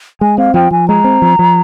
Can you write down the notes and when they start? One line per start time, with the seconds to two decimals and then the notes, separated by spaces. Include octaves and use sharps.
0.21 G#3 G#5
0.38 C4 F5
0.54 F3 G5
0.71 F3 G#5
0.88 G#3 A#5
1.04 C4
1.22 F3
1.39 F3